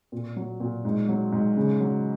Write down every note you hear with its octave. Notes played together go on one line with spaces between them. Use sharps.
A#2
F#3
A#2
G#2
F#3
G#2
C#3
F#3